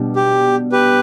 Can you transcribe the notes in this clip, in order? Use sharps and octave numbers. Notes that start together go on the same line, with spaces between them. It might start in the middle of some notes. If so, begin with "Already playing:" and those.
Already playing: B2 G3 D4
G4
G4 B4